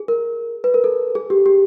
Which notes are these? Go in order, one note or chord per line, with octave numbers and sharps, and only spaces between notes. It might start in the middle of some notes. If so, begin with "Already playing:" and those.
Already playing: G#4
A#4
B4
A#4
A4
G#4
G4
G4